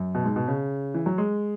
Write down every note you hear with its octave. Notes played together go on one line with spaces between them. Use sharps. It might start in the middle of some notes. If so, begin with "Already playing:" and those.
Already playing: F#2
B2
G#2
B2
C#3
E3
F#3
G#3